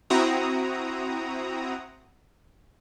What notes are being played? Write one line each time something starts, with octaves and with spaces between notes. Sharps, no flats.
C4 E4 F#4 A#5 D#6